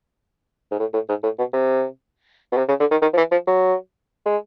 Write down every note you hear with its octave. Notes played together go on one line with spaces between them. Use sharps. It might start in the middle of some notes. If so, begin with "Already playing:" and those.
G#2
A2
A2
G#2
A2
B2
C3
B2
C3
C#3
D3
D#3
D#3
F3
E3
F3
F#3
G#3